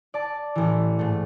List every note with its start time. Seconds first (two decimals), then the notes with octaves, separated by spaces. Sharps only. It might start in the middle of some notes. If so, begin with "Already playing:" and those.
0.14 D5 A5 D6
0.55 A1 E3
0.99 G#2 A3